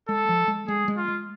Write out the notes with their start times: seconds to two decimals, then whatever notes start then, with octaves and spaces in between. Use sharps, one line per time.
0.08 G#3 A4
0.29 F3
0.48 G#3
0.68 G#3 G#4
0.88 G#3
0.97 F4
1.08 G#3